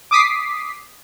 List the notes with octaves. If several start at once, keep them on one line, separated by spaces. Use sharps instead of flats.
D6 D#6 B6 C7